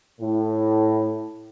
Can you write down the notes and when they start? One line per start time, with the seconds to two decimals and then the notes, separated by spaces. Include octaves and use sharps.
0.20 A2